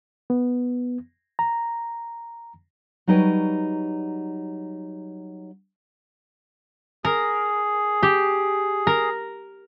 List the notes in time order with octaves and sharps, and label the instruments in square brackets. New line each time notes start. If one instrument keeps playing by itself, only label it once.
[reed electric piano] B3
A#5
[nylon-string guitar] F#3 G3 D#4 B4 C#5 G5
[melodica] G#4 [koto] A#4
[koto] G4
A#4